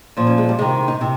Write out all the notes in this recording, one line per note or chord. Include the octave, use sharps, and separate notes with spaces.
A#2 F3
C#4
G#3
G3
C3 D#3 G#3
D#4
C3